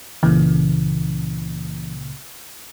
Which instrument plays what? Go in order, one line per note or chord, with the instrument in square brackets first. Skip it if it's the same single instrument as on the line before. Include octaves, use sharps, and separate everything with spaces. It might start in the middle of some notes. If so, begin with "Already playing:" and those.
[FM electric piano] C#2 A#2 C#3 [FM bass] E3